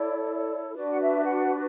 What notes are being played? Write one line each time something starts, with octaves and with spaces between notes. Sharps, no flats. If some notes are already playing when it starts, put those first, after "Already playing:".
Already playing: E4 A4 C#5 D5
D4 F#4 B4 D5
F#5
E5
F#5